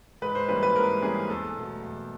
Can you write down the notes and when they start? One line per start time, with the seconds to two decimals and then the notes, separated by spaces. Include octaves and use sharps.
0.22 G#2 B4
0.35 C5
0.49 E3 G3 A#3 C#4 B4
0.63 B4
0.75 G#2 A#4
1.02 E3 G3 A#3 C#4 G#4
1.29 E2 A4
1.57 B2 F#3 A3
1.83 E2